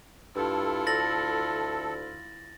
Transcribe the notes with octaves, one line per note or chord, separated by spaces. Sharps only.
G2 E4 F4 A4
D2 A6 A#6 F#7